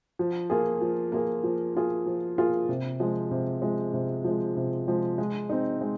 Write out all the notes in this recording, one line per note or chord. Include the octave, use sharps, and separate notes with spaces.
F3
A#3 F4 G#4
F3
A#3 F4 G#4
F3
A#3 F4 G#4
F3
A#3 F4 G#4
C3
F3 G#3
C3
F3 G#3
C3
F3 G#3
C3
F3 G#3
G#3
C4 D#4
G#3